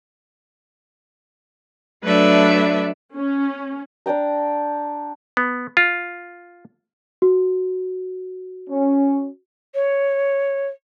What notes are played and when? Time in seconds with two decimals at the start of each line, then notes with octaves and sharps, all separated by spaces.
2.04 F#3 A3 D4 B4 D5 E5
3.15 C#4
4.06 D4 D5 G5 A#5
5.37 B3
5.77 F4
7.22 F#4
8.69 C#4
9.75 C#5